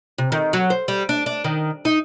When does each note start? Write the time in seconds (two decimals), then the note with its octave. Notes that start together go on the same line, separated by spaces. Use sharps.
0.18 C3
0.32 D#3
0.53 F#3
0.70 C5
0.88 G3
1.09 D4
1.26 D4
1.44 D#3
1.85 D#4